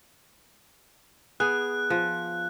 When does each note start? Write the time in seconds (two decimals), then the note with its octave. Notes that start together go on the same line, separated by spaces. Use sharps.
1.40 B3 G#4 F#6
1.90 F3